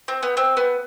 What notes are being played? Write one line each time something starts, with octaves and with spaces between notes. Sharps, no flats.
C4
B3
C4
B3